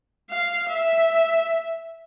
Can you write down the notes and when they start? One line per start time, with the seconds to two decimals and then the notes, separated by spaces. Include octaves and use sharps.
0.30 F5
0.70 E5